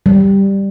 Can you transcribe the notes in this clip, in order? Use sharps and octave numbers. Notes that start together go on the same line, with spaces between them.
G3